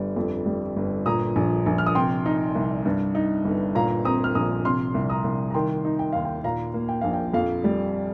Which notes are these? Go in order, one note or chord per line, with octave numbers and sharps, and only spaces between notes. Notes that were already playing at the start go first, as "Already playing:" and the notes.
Already playing: G1 G3
F2
G3
G1
A#2 A#5 D#6
A#1
A#1
F6
D#6
C3 G5 C6
D#4
C2
G2
D#4
G1
A#2 F5 A#5
C4 A#5 D#6
F6
A#1 A#5 D#6
C3 C6 F6
C2
A#5 D#6
C2
A#5
D#3 G5 C6
D#4
G5
D#2 F5
G5
A#2 F5 A#5
A#3
G5
A#1 F5
G5
F2 F5
G3